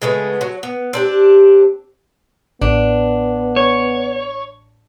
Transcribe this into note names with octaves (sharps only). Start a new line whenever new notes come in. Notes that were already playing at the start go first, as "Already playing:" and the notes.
C#3 G#3 A3 B3
F#3
B3
C4 D4 G4
A1 B3 D4
C#5